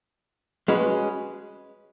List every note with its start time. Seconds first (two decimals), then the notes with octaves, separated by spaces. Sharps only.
0.68 G#3 C#4 F#4 B4